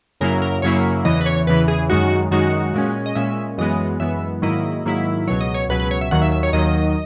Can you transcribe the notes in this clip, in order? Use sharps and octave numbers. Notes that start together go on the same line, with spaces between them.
F#2 C#3 F#3 A#3 E4 A#4
A#4
F#2 C#3 F#3 A#3 E4 C#5
E2 C#3 E3 D#5
B4
C#5
E2 C#3 E3 B4
G#4
F#2 D#3 G#3 D#4 F#4
F#2 D#3 G#3 D#4 F#4
A#2 G#3 C#4
D#5
A#2 G#3 C#4 E5
F#2 E3 G#3 B3 D#5
F#2 E3 G#3 B3 E5
G#2 D#3 F#3 A#3 E4 D#5
G#2 D#3 F#3 A#3 E4
C#2 B2 F#3 C#5
D#5
C#5
C#2 B2 F#3 B4
B4
C#5
E5
D#2 D#3 F#3 F#5
E5
E5
C#5
D#2 D#3 F#3 D#5